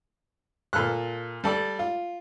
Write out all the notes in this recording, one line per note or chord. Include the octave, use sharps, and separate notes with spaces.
A#2 A4 F6 F#6
G3 A4 D5
F4